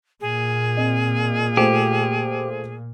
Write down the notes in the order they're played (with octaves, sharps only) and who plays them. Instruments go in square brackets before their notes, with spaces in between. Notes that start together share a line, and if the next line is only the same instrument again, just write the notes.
[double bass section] A#2 [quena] G#4
[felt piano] C4 D#5
[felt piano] A3 F4 C5 [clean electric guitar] G4